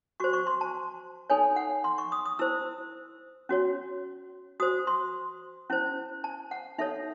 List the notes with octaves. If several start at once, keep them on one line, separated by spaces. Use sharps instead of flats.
F#4 C5 C#6
C#6
C6
A5
D#4 A4 C#5 G#5
F#5
C6
C#6
D#6
D#6
E4 C5 E6
C#4 F#4 C#5
F#4 C5 D#6
C6
C#4 E4 C5
A5
F#5
D#4 A4 C#5 E5